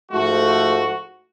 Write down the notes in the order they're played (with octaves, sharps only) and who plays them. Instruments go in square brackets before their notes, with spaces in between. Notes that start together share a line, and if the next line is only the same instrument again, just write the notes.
[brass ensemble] G#2 F3 A3 F#4